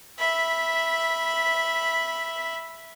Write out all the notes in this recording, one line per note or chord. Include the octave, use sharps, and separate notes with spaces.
E5 B5